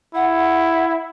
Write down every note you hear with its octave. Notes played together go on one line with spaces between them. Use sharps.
E4 F#5